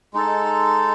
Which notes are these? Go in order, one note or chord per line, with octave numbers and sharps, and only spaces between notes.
G#3 D#4 A4